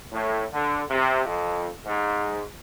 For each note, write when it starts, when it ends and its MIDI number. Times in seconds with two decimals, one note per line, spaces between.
0.12 0.43 45
0.52 0.82 50
0.90 1.23 48
1.25 1.69 41
1.86 2.41 44